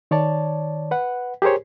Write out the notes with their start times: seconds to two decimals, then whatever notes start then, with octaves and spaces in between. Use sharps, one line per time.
0.11 D#3 C#5 D5 A5
0.91 B4 F#5
1.42 G4 G#4 A#4 C5 C#5